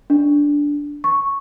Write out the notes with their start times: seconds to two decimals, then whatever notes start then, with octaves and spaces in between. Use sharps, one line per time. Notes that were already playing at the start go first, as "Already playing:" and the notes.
0.10 D4
1.04 C#6